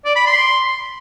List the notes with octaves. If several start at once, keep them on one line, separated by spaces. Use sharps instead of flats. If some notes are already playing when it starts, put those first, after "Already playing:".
D5
B5
C6